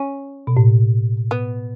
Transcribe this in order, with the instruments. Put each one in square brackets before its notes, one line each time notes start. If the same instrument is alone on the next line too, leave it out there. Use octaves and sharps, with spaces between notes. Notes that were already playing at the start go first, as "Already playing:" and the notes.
Already playing: [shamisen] C#4
[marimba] B2
A2
[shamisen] B3